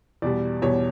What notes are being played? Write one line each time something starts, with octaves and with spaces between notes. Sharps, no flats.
E2 B2 G3 D5
E2 B2 G3 C#5